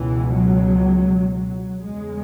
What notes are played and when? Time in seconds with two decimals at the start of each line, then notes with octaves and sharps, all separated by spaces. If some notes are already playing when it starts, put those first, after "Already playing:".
Already playing: C#2 B2 E3
0.32 F#3
1.33 F#3
1.83 E2 C#3 G#3